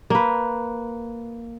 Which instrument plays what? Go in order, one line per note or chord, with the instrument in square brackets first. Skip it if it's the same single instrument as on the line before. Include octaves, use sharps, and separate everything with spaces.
[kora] A#3 B4